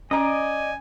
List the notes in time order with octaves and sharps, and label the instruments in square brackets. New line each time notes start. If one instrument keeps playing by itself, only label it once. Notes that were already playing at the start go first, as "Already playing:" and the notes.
[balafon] C#4 A#5 [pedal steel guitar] D5 D#5 [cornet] G#5